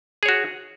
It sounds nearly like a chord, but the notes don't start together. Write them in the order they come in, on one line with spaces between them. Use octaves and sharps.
G#4 C#5 F#4